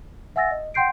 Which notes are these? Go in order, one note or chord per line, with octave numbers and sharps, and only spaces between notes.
E5 F#5 G#5 E6 A6 A#6
D#5
F#5 G5 C6 G6 C7 D7